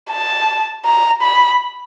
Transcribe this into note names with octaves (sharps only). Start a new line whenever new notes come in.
A5
A#5
B5